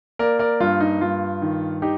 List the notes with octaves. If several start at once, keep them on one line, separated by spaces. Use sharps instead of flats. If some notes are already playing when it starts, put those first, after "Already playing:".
A#3 A#4 D5
A#4 D5
G2 F4
D#4
G2 F4
D#3
D#4 G4